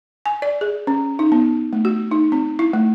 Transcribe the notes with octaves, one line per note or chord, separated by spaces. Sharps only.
G#5
D5
G#4
C#4
D#4
B3
A3
F#4
D#4
C4
E4
A3